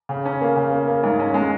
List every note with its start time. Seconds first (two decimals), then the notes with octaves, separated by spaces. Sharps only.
0.09 C#3
0.25 C#4
0.41 A#3
0.56 C#3
0.71 A#3
0.87 A#3
1.04 G#2
1.19 C#4
1.34 G#3